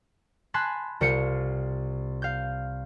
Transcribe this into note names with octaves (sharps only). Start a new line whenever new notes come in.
G#5 A5 B5 C6 F#6
C2 F4 C5 C7 C#7
F5 G6